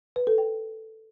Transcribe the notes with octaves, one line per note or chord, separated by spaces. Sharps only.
B4
A4
G5